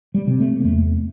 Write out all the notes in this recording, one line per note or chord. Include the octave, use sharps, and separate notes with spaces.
G3
C3
A3
A#3
E2 A3